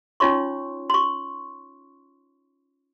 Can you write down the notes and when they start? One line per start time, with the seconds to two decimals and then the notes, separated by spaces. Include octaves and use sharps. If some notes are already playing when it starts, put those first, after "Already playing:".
0.20 C#4 D#4 F4 C#5 C6 C#6
0.90 C6 C#6